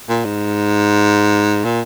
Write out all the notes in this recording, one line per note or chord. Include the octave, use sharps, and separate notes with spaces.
A#2
G#2
A#2